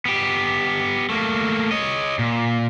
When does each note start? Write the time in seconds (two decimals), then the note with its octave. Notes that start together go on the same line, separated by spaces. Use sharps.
0.05 B3 G4
1.10 A3 A#3
1.72 C#5 D#5
2.19 A#2